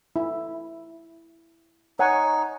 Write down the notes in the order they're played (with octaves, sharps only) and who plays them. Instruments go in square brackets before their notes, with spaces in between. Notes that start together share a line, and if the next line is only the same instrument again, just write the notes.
[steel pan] E4
[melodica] D#4 [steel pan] C#5 F#5 G#5